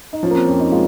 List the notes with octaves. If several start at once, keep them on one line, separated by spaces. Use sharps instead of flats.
D#4
F3 C#4
A#3
C4
F2 C#4
D#4
G#3 F4